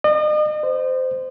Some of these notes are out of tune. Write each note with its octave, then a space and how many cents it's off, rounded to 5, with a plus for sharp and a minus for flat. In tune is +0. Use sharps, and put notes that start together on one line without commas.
D#5 -40
C5 -15